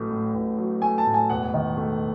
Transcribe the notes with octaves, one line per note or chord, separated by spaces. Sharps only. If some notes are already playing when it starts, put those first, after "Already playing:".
Already playing: A1 F#3 A3
A2
A1
F#3
A3 G#5
A5
A2
G#5
E1 F#5
D#3
A3